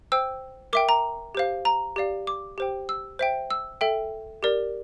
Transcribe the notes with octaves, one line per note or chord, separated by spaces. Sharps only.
C5 G5 E6
A#4 E5 G5 D6
A#5
G4 C5 F5
A#5
G4 D5 F5
D6
G4 C5 G5
E6
C5 E5 G5
E6
A4 E5 G5
G4 A#4 D5